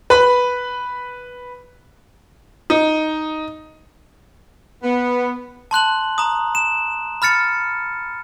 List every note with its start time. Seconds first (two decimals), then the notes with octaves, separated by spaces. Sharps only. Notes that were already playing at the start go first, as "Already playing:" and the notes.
0.10 B4 B5
2.70 D#4
4.83 B3
5.71 A5 C6 F#6 F#7
6.18 A#5 D#6
6.55 E7
7.22 B5 F6 A6 C#7